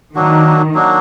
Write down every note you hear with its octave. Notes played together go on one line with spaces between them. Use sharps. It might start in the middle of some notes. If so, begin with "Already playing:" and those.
D#3 F#3 A#3 D4 F#4
F#3 A#3 D4 F#4